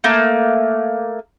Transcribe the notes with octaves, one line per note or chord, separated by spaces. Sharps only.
A3 A#3